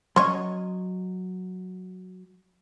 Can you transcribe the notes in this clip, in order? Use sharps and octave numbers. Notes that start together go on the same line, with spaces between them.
F#3 C#4 C#5 D#5 C6